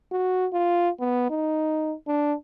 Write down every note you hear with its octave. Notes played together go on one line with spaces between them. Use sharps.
F#4
F4
B3
D#4
D4